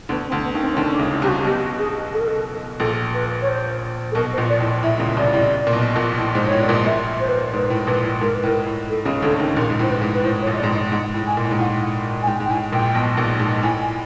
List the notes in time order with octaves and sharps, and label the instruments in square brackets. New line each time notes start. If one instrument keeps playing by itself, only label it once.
[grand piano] D2 D3 [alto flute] B3
[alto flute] C4
[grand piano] D2 D3
[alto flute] B3
[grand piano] D#2 D#3
[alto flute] C4
C#4
[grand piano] D2 D3 [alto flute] C4
[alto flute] C#4
D4
[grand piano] C#2 C#3
[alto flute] E4
[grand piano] C2 C3 [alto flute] G4
[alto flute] F#4
[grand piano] B1 B2 [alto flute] G4
[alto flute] G#4
A4
A#4
A4
[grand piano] A#1 A#2 [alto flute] A4
[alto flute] B4
C#5
C5
A4
[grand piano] B1 B2 [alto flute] A#4
[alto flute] C5
[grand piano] A#1 A#2
[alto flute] D5
[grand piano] A2
[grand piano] A2 [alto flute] E5
[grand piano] C#2 C#3
[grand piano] C2 C3 [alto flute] D5
[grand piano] A2
A#2
B1 B2
A#1 A#2
A2
[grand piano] G#2 [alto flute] C5
[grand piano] A2 [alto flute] C#5
[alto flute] D5
[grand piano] A#1 A#2
[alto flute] D#5
[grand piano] A#1 A#2 [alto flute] E5
[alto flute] C5
B4
C5
[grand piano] G#2 [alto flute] B4
[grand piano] A2
[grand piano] A#1 A#2 [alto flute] B4
[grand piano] A2
[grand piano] G#2 [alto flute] A#4
[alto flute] B4
[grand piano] A2
[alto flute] A#4
[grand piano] A2
[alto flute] A4
[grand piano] C#2 C#3
[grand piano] D2 D3 [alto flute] A4
[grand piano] D#2 D#3
[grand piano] A#1 A#2 [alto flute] A#4
[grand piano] G#2
[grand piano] A2 [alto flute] C5
[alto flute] B4
[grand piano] G#2
[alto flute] B4
[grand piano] A2 [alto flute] C5
[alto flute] C#5
[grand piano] A#1 A#2
[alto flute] D#5
D5
[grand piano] G#2
A2
[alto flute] D#5
[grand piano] G#2 [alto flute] F#5
[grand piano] A2
[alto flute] G#5
[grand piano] A#2
A2
G#2
[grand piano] A2 [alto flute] F#5
[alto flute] F#5
G#5
[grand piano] G#2 [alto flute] G5
[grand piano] G#2 [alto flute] G5
[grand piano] A2 [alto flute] G#5
[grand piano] A#1 A#2 [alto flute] G5
[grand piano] B1 B2
A#1 A#2
G#2
[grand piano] A2 [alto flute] G#5
[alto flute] G#5